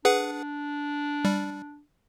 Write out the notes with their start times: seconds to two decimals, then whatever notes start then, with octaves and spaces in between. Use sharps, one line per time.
0.05 D4 G#4 B4 F#5
1.25 G3